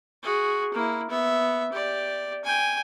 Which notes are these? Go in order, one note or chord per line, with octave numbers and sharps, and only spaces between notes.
F#4 G#4
A#3 E4
B3 E5
G4 D5
G5 G#5